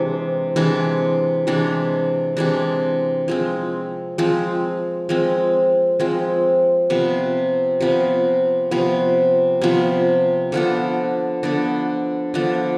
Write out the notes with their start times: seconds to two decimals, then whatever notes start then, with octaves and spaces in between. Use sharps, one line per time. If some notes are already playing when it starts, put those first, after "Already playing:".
Already playing: C3 E3 G#3 D4
0.56 C3 E3 G#3 D4
1.47 C3 E3 G#3 D4
2.37 C3 E3 G#3 D4
3.28 F3 G#3 C4
4.18 F3 G#3 C4
5.09 F3 G#3 C4
5.99 F3 G#3 C4
6.90 C3 F3 B3
7.80 C3 F3 B3
8.71 C3 F3 B3
9.61 C3 F3 B3
10.52 D3 F3 B3 D4
11.43 D3 F3 B3 D4
12.34 D3 F3 B3 D4